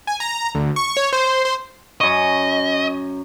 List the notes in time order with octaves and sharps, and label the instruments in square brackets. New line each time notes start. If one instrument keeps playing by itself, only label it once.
[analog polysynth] G#5
A#5
D2
C#6
C#5
C5
C5
[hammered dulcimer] F#2 C#6 [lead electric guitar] D#5